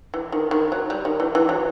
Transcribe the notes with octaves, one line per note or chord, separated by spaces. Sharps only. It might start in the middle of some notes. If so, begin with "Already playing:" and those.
E3
D#3
D#3
F#3
G3
D#3
E3
E3
F#3